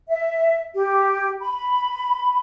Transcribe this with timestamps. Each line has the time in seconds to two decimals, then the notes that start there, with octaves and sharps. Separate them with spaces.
0.09 E5
0.74 G4
1.41 B5